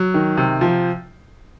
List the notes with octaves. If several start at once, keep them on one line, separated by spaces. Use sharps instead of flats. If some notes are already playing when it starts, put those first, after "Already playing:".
Already playing: F#3
D#3
C3
F3